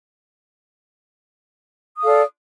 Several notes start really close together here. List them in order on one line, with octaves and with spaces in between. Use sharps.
D#6 A4 F5 D5